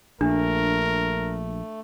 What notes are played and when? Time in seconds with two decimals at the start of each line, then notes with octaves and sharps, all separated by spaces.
0.21 A#1 A3 D4 A#4